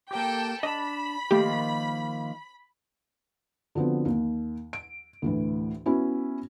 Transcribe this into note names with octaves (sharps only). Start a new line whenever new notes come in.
A#3 G4 A4 G5
D4 D#5 A5 B5
D#3 F3 A3 A#3 G4
D3 F3 B3 C4 F#4
D#2
D7
D2 A2 E3
B3 C#4 E4 F#4